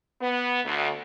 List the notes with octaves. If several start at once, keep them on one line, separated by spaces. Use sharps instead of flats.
B3
D2